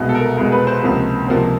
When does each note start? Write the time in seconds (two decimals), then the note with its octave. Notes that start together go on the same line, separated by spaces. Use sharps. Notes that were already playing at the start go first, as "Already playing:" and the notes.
Already playing: C2 B2 G#3
0.09 A4
0.15 A#4
0.37 C2 B2 G#3 A#4
0.52 B4
0.67 C5
0.82 C#2 C3 F3 A#3
1.27 C#2 C3 F3 A#3